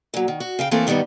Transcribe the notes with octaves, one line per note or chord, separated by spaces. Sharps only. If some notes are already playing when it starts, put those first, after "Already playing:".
A#2 F#3
D#3
F#4
C#3 F5 G5
E3 A3 A#3 C4 A4 A#4
G2 D#3 G3 B3 D#4